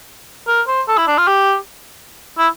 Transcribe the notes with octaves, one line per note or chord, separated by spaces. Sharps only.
A#4
C5
A4
E4
D4
F4
G4
E4